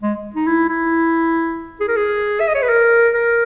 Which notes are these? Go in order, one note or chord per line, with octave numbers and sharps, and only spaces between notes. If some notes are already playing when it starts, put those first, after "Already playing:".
G#3
D#4
E4
E4
G#4
A#4
G#4
E5
D#5
C#5
B4
A#4
A#4